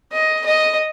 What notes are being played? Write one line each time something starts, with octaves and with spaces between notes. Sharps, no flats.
D#5
D#5